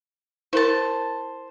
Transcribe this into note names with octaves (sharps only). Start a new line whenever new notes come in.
E4 A#4 C5 A5